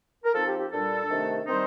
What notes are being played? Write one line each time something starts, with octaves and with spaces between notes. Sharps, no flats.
A#4
F3 C4 D#4 A4
G4
G4
A#2 G3 D4 A4
C3 D#3 A3 D4
D#3 G3 C4 D#4 C5